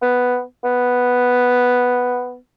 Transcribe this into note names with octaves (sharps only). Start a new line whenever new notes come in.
B3
B3